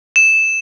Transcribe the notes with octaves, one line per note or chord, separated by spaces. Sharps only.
E7